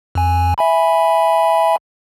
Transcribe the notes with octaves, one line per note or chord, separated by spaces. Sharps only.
F2 G#5
E5 G#5 B5